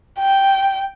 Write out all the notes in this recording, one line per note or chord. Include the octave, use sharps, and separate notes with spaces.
G5